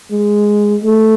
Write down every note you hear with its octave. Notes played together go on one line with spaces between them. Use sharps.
G#3
A3